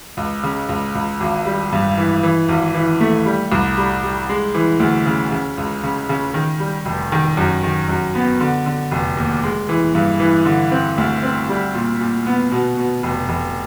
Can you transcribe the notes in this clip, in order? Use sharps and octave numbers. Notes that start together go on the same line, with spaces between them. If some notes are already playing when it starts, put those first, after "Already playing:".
C#2
C#3
C#2
C#2
G#1
G3
G2
E3
E3
G#1
E3
A3
G3
C2
G3
G3
G#3
E3
D2
C#3
C#3
C#2
C#3
C#3
D#3
G3
F1
D#3
F#2
D#3
F#2
B3
D3
D3
F1
D#2
G#3
E3
G2
E3
D3
C4
D2
C4
G3
A#2
A#2
B3
B2
B2
F1
F1